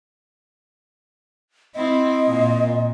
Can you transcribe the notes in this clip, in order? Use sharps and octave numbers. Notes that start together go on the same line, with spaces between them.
C4 E4 D#5
A#2